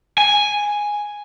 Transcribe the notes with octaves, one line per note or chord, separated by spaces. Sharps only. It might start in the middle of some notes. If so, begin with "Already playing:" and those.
G#5